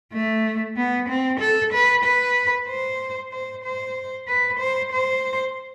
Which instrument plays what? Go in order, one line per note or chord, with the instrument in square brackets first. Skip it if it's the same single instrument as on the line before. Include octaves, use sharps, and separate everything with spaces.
[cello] A3
B3
C4
A4
B4
B4
C5
C5
C5
B4
C5
C5